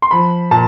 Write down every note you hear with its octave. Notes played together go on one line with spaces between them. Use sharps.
C6
F3 B5
A#2 A5